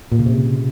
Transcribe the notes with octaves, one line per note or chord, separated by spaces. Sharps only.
A#2
C#3
C3